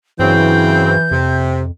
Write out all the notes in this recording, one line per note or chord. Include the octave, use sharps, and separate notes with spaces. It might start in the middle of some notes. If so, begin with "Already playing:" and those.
G2 C#3 E3 F#3 C4 G6
F2 C3